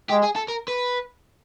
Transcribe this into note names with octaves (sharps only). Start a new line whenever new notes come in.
G#3 G4
G#4
A4
A#4
B4